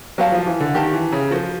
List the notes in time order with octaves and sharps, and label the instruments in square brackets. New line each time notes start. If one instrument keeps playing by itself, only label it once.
[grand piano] F#3 [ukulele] G4 C5 F5 A5
[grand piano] F3
E3
D3
[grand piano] D#3 [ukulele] G4 C5 F5 A5
[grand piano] E3
C#3
[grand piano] F3 [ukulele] F#4 A4 C5